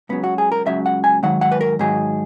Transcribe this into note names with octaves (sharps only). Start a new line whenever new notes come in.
C#2 C#3 F#3 B3
F#4
G#4
A#4
C#2 C#3 F#3 E5
F#5
G#5
G#2 D#3 F#3 F#5
F#5
B4
A#4
G#2 D#3 F#3 G#4